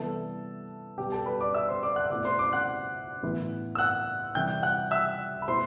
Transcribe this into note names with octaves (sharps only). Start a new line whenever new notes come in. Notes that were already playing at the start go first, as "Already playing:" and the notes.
Already playing: C3 E3 G3 B3 E4 A4 A5
B2 G3 B3 G4 G5
A4 A5
B4 B5
D5 D6
E5 E6
C5 C6
D5 D6
F#5 F#6
B2 A3 C4 E4 D5 D6
C5 C6
D5 D6
F#5 F#6
A2 E3 B3 E4
E6
F#5 F#6
C3 E3 G3 G5 G6
F#5 F#6
E5 E6
B5
B2 A3 E4 C5 C6